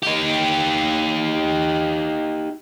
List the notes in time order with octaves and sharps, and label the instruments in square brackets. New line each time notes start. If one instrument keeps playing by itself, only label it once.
[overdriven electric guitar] D#4 G4